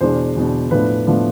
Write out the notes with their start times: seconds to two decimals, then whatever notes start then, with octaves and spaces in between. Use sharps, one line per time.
0.01 E2 B2 G#3 D4 C5
0.36 E2 B2 G#3 D4
0.71 A2 F3 B3 D4 B4
1.06 A2 F3 B3 D4